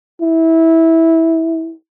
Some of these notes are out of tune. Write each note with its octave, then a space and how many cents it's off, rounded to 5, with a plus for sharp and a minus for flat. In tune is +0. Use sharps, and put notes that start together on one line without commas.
E4 -15